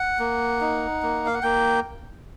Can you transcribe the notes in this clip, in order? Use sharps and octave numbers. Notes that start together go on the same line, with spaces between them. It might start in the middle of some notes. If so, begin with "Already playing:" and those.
Already playing: F#5
A#3
D#4
A#3
F5
F#5
A#3 G5